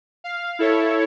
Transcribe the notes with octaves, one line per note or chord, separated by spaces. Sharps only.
F5
E4 A4 C#5